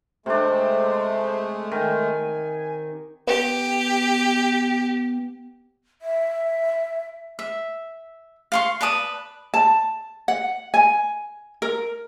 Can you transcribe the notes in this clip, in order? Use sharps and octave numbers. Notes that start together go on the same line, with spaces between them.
C3 G#3 A3 D4 C5
D#3 G#5
B3 G4
E5
E5
F5 C6 C#6
B4 D5 A5 D#6
A5
F#5
G#5
A#4